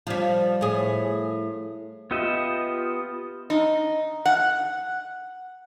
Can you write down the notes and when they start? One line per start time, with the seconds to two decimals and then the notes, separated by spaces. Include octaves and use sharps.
0.07 F3 G3
0.61 A2 G#4
2.11 B3 F4 G4 D#5 E5
3.50 D#4
4.25 F#5